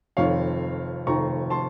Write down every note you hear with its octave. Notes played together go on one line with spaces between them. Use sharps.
F1 F2 D#3 C#5 F5
F1 F2 D#3 A#5 C#6
A5 C6